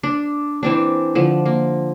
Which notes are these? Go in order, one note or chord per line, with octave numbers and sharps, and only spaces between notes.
D4
E3 C4 D4
D3 F3
A#3